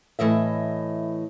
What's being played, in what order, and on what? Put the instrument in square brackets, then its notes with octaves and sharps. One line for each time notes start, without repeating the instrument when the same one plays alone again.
[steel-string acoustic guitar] A2 E3 D#5 E5